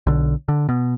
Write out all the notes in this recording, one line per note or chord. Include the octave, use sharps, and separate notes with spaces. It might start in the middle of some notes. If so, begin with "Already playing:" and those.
B1 D3
D3
B2